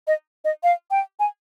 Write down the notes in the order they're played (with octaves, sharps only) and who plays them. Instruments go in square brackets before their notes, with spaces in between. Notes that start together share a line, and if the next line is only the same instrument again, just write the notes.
[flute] D#5
D#5
F5
G5
G#5